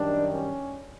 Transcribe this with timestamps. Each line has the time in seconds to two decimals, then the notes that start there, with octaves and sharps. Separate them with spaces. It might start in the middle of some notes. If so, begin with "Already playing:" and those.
Already playing: F#2 D#3 G3 D4
0.32 C#4